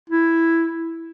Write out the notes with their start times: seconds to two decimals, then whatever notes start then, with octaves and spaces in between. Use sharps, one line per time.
0.10 E4